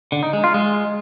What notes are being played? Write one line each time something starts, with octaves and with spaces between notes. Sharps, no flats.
D3
D#4
G#3
F4
G#3